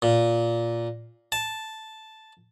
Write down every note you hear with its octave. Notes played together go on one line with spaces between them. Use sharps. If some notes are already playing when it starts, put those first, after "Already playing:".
A#2
A5